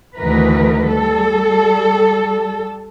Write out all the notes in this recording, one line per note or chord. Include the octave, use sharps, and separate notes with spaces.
D2 D#3 E3 A#4 B4
G3 A4